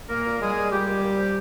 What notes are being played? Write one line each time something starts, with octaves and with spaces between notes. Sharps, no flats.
A#2 A#3 A#4
A#2
G3 G#3 G#4
G3
A#2 G3 G4
A#2
A#2
F3